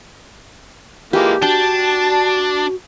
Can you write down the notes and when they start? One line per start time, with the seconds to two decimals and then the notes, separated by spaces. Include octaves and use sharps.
1.13 E3 G#3 A#3 F4 G4
1.42 D4 F#4 G5 A5